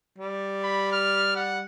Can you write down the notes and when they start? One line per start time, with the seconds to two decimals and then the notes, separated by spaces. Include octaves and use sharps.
0.18 G3
0.63 B5
0.92 F6
1.36 F#5